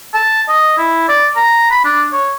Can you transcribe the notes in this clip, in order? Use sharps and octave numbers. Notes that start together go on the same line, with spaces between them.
A5
D#5
E4
D5
A#5
B5
D4
C#5